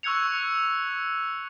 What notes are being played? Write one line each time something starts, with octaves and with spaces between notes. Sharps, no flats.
C#6 E6 F#6 G#6 C#7 F7